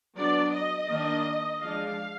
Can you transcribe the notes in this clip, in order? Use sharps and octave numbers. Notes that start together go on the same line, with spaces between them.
F#3 B3 D4 D5
D#5
D#3 A#3 D4
F3 G#3 D4 F5